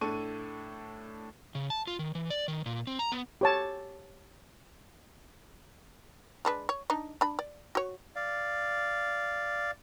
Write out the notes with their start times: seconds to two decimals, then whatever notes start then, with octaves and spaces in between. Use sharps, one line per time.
0.01 A2 D4 A4 C#6 D#7
1.55 C#3
1.70 A5
1.87 F4
1.99 D#3
2.15 E3
2.30 D5
2.48 D#3
2.66 A#2
2.87 C4
2.99 A#5
3.12 B3
3.41 G4 C#5 A5
6.45 G#3 D4 B4
6.69 C#5
6.90 D4 D#4
7.21 D4 B5
7.39 D5
7.75 F#4 C#5
8.16 D5 F5